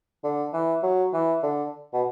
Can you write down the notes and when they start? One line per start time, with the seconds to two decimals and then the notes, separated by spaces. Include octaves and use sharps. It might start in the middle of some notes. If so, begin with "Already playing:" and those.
0.24 D3
0.53 E3
0.83 F#3
1.13 E3
1.43 D3
1.93 B2